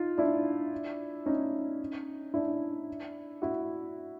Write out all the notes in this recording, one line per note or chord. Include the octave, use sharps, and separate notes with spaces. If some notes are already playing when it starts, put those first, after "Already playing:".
Already playing: D#4 F4
D4 E4
C#4 D#4
D4 E4
E4 F#4